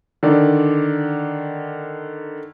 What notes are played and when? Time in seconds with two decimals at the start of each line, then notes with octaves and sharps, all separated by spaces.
0.23 D3 D#3 D5